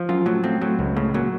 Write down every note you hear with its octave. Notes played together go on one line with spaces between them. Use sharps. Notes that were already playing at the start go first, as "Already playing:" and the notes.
Already playing: F3
F#2 F4
A2 F#3
A2 C4
A2 F#3
C#2
A2 C#3
A#2 F#3